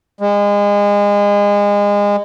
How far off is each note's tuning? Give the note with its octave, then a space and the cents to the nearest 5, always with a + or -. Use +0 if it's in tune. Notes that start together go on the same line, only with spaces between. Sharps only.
G#3 -30